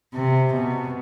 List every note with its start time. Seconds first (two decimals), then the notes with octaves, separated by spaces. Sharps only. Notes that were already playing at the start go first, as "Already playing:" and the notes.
0.14 C3
0.53 B2